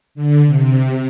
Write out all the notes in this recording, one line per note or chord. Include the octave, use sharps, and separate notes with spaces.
D3
C3